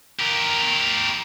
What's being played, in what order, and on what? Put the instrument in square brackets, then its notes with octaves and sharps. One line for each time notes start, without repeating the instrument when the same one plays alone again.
[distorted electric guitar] G4 A#4